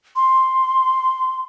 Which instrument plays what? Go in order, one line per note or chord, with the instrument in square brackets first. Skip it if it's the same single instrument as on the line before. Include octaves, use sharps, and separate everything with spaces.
[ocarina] C6